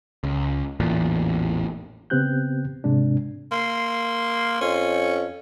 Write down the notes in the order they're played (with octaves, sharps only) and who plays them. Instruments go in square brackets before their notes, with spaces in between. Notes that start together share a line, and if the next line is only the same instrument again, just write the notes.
[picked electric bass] C#2
A1 E2 A#2
[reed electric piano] C#3 B3 C4 G4 F#6 G6
G#2 C3 G#3 D4
[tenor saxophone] A#3 [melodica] C6
[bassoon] F2 [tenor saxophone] C#4